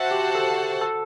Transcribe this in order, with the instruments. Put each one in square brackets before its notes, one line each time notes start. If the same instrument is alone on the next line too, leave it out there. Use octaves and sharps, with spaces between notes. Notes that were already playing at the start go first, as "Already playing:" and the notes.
Already playing: [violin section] F#4 C5 F#5 A5 [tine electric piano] E5
[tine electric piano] G4
A4
A4